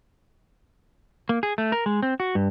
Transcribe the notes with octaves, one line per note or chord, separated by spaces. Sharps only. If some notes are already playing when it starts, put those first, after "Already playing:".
A#3
G#4
A3
A#4
G#3
C4
F#4
G2